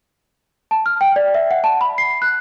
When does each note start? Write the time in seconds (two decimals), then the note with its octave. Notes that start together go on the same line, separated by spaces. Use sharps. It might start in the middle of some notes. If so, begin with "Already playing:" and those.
0.71 A5
0.86 F6
1.01 G5
1.16 D5
1.34 E5
1.51 F#5
1.64 A5
1.81 B5
1.98 C7
2.22 F#6